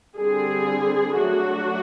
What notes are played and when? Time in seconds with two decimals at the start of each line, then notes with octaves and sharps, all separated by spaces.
0.18 D3 G3 C4 G#4
1.18 F#3 A3 D4 F#4